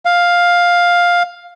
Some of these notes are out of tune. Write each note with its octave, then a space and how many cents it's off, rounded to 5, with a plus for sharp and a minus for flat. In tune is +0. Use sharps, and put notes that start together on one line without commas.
F5 +10